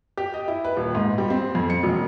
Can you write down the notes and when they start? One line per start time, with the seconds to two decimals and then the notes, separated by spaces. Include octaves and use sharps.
0.17 G4
0.34 D#5
0.48 E4
0.64 B4
0.77 D#1
0.95 G#2
1.18 G3
1.30 C4
1.55 F2
1.70 C#7
1.83 E1